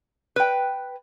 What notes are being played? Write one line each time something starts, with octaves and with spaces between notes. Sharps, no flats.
B4 G5